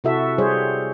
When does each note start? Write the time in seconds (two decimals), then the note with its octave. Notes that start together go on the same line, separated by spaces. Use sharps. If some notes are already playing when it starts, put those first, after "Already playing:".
0.04 C3 E4 F#4 A4 E5
0.38 G3 G#4 C5 C#5